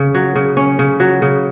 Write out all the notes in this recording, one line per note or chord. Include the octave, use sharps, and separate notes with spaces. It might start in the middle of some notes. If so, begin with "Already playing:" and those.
Already playing: C#3
F#3
C#3
C#4
C#3
F#3
C#3